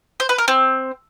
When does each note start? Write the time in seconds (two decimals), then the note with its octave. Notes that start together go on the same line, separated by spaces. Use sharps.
0.20 C5
0.29 B4
0.38 A#4
0.48 C4